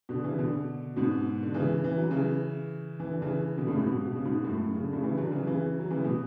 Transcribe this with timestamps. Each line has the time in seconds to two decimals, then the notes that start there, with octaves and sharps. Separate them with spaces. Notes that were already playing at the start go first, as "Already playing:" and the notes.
0.09 B2 D3
0.24 C#3 E3
0.38 B2 D3
0.96 G#2 B2
1.43 D3
1.54 C#3 E3
1.84 E3
1.97 F#3
2.11 C#3 E3
3.00 E3
3.11 D3
3.22 C#3 E3
3.57 B2 D3
3.67 A2 C#3
3.73 F#2
3.77 G#2
3.87 B2
3.96 C#3
4.07 B2
4.16 C#3
4.25 G#2 B2
4.45 F#2 A2
4.74 C#3
4.83 D3
4.92 A2 C#3
5.03 C#3 E3
5.17 D3 F#3
5.32 C#3 E3
5.47 C#3 E3
5.79 F#3
5.90 C#3 E3
5.99 A2
6.04 B2